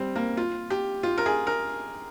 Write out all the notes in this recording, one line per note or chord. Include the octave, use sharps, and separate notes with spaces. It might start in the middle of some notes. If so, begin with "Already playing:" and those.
Already playing: G3 C4
A#3
F4
G4
F4
A#4
G#4
A#4